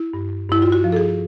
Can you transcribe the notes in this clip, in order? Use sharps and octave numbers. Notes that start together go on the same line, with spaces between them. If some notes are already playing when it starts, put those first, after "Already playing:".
Already playing: E4
G2
G2 E4
F4
F#4
F3
A4
G#4